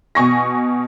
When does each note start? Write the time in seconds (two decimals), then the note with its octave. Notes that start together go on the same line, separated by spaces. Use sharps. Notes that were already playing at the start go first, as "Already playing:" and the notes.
0.15 B2 G#5 C#6 A#6